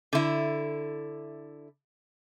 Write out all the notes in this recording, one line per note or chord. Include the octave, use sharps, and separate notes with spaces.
D3 E4